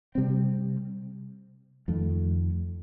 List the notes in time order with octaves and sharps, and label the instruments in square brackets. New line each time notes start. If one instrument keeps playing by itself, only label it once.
[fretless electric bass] C3 G3 C4
F2 D#3 A3